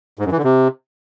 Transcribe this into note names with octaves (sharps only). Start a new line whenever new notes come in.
G#2
F#2
E3
D3
C3